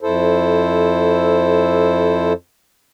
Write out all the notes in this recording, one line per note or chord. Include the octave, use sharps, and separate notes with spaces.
F2 E4 A4 C5